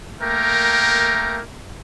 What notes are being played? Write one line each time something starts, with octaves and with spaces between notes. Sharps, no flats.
A3 A#3 A#4 G5 A#5